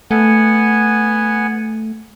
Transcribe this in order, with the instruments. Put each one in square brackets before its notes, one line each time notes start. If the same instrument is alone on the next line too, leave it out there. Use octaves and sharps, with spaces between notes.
[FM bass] A3 [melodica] B3 F#5 G#5